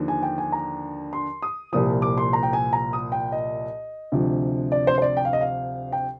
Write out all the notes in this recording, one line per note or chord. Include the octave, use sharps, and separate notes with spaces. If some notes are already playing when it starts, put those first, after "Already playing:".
Already playing: D#2 D3 F3
G#5
G5
G#5
A#5
C6
D#6
C2 A#2 F3 D#6
D6
C6
A#5
G5
G#5
A#5
D#6
G5
D#5
D2 C3 F3
D5
C5
C5
D5
G5
F5
D#5
F5
G5